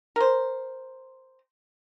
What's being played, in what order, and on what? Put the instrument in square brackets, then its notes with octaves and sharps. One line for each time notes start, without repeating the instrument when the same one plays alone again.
[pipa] A#4 C5